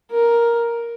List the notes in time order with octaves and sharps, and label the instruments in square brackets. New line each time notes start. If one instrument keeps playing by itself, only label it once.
[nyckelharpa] A#4